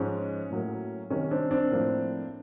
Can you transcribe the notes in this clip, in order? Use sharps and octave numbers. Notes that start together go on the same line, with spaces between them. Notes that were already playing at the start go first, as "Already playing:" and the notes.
Already playing: G#2 F3 G#3 C#4
A2 F#3 A#3
C3 D#3 G3 C#4
C4 D4
C4 D4
A2 F3 A#3